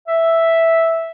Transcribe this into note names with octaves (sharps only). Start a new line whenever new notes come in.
E5